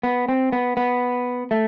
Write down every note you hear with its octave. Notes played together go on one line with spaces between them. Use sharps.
B3
C4
B3
B3
A3